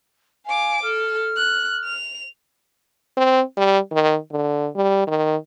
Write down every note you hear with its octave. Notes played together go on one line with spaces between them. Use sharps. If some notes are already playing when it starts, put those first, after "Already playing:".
F5 G#5 D6
A4 F6
F#6
F7
C4
G3
D#3
D3
G3
D#3